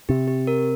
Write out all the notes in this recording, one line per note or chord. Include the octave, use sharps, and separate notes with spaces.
C3 G4
G4
A#4